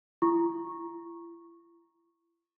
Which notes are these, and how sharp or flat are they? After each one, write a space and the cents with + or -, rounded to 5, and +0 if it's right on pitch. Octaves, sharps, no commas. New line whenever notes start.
E4 +45 C#6 -10